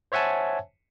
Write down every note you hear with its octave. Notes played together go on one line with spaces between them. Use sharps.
C5 C#5 E5 F#5 G#5 A5